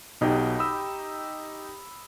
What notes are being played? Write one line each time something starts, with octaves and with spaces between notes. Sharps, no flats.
B1 B2 D#4 G4 G5
B5 D#6 E6